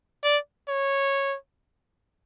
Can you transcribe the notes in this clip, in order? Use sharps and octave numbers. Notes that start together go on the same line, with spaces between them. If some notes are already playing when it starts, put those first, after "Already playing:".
D5
C#5